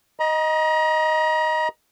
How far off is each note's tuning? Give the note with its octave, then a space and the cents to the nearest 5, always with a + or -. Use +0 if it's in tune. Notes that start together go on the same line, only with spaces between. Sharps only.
D#5 +0 A#5 +35